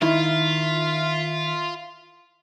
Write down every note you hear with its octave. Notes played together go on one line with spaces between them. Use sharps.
D#3 E4 F4 E5